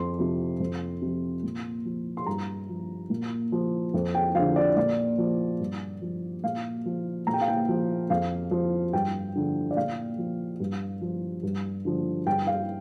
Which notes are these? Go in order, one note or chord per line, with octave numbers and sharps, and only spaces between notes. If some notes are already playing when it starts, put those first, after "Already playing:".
Already playing: F2 C6
C3 F3
F2
C3 F3
A#2
F3
C6
G2 A#5
F3
A#2
F3
F2
G5
D3 F3 F5
D5
A#2 D5
F3
G2
F3
A#2 F5
F3
A#2 A#5
G5
F5
G5
F3
F2 F5
F3
G2 G5
D3 F3
D5
A#2 F5
F3
G2
F3
G2
D3 F3
G2 G5
F5